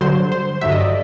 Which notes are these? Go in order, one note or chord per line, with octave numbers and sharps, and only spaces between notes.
G2 D3 F#3 C5
C5
G2 D3 F#3 E5
D#5
D5